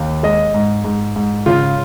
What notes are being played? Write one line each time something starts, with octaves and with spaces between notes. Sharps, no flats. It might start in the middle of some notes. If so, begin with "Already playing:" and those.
Already playing: D#2
G#3 D#5
G#2
G#2
G#2
C#3 F4